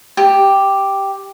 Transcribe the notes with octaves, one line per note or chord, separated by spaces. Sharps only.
G4